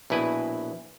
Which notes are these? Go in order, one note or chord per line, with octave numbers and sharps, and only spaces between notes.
A#1 B2 E4 B4 G#5